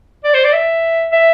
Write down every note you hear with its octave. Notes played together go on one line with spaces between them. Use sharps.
D5
C5
D5
E5
E5